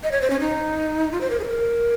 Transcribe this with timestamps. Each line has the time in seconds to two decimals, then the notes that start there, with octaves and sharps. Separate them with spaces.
0.03 D#5
0.12 C#5
0.21 C5
0.30 C#4
0.40 D#4
1.12 F4
1.21 C5
1.30 A#4
1.40 G#4
1.44 C5
1.48 A#4